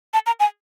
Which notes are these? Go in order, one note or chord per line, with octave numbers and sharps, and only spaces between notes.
A5
A#5
G#5